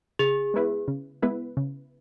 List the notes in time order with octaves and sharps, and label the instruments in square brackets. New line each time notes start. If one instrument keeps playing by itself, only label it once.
[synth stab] C#3 [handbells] G#4
[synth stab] G#3 B3 E4 B4
C#3
G#3 B3 E4 B4
C#3